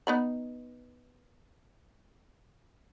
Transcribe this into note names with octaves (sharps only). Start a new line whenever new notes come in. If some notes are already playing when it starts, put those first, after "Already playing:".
B3 D#4 B5